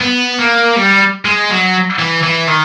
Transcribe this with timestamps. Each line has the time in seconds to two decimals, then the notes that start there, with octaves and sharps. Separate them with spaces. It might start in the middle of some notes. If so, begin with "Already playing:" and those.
0.01 B3
0.39 A#3
0.76 G3
1.25 G#3
1.50 F#3
1.99 E3
2.23 E3
2.48 D#3